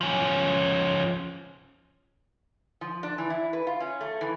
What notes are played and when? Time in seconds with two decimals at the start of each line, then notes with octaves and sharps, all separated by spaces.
0.01 F3 C#4
2.81 F3
3.03 D4
3.18 E3
3.30 E4
3.53 B4
3.67 F4
3.80 C#4
4.01 A3
4.21 E3